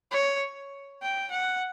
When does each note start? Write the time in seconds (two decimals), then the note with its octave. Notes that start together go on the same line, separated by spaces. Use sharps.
0.11 C#5
1.02 G5
1.32 F#5